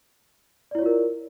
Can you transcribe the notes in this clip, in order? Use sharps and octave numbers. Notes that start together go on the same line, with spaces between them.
E4 F4 A#4 C#5 D5